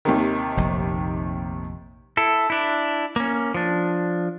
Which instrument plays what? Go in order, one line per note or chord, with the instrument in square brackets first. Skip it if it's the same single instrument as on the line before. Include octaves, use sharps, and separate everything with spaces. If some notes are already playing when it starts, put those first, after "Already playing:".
[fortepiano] D#2 C3 D#3
[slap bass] F1 A#1
[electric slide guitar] E4 A4
D4 E4
A#3 C#4
F3 D4